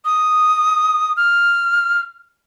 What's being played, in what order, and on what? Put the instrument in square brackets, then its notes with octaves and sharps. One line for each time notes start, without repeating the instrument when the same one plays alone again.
[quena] D#6
F6